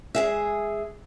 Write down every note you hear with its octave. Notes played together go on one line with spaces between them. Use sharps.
G#3 G#4 E5